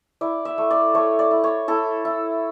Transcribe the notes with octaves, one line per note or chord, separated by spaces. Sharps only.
E4 D5
E5
A3
D5
A3 C#5
D5
E4
C#5
E4 A4
E4